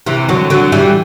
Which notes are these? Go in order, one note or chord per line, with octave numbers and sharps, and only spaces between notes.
C3 E3
D3 F#3
D3 F#3
E3 G3